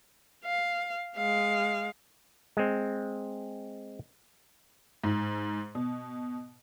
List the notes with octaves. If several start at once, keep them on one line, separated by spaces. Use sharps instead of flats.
F5
G#3 F5
G#3 C4
G#2
B2